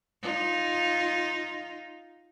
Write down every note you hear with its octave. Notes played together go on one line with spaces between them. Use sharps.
D#4 F4